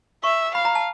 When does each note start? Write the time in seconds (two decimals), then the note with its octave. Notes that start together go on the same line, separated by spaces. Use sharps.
0.24 E5 C#6
0.55 F5 B5
0.65 A#5
0.75 A5